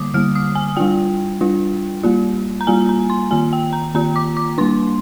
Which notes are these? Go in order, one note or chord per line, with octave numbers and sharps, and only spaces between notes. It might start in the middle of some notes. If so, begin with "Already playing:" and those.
Already playing: D3 G3 A#3 D6 D#6
D3 G3 A#3 F6
D#6
G#5
G3 D4 F4 G5
G3 D4 F4
G3 A#3 F4
A#5
G3 A#3 F4 G#5
A#5
C6
D#3 A#3 F4 G#5
G5
A#5
D#3 A#3 F4 A#5
D6
D6
G3 A#3 D4 C6